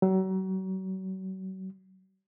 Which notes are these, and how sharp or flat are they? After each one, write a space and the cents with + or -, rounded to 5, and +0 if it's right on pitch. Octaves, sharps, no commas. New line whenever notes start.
F#3 +35